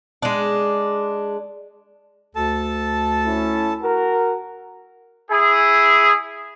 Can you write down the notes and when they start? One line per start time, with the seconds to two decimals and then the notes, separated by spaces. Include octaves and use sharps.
0.22 G#3 D4
2.35 D2 A4 A5
3.25 A3 C#4 E4
3.82 F#4 A#4
5.30 E4 G#4